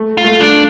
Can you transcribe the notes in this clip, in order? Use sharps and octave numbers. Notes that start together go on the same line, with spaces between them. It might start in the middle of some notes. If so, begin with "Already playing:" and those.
Already playing: A3
F4
A3
D4